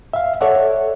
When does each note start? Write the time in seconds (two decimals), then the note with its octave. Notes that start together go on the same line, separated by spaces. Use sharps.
0.13 E5 F5
0.41 A4 C#5 D5 E5 F#5